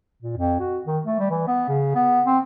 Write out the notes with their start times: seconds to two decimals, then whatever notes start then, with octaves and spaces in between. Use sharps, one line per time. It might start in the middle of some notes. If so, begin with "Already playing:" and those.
0.22 A#2
0.37 F2
0.60 F#4
0.86 D#3
1.06 A3
1.19 G3
1.31 E3
1.48 B3
1.68 C#3
1.95 B3
2.26 C4